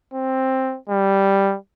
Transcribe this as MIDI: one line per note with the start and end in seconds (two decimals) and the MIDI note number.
0.14 0.77 60
0.90 1.56 55